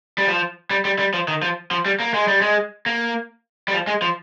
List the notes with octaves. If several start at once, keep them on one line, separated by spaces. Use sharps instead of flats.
G3
F3
G3
G3
G3
F3
D#3
F3
F3
G3
A#3
G#3
G3
G#3
A#3
G3
F3
G#3
F3